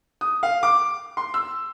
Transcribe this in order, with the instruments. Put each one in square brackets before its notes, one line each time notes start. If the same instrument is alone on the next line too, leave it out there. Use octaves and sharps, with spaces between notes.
[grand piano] D#6
F5
D6
C6
E6